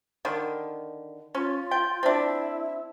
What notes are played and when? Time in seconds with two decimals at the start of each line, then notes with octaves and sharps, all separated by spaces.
0.25 D3 D#3
1.35 C#4 F4
1.71 G5
2.03 C4 D4 E4